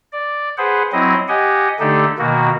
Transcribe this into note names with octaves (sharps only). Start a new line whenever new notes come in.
D5
G#4 B4 C5 F#5
F#3 C4 E4 D#5
G4 D#5 F#5 G#5
D3 A3 D4 D#4 G4 A4
B2 D#3 A#3 F#4